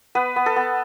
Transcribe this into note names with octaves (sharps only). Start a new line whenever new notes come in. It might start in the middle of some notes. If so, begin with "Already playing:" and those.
B3 B4
B3
A4
B3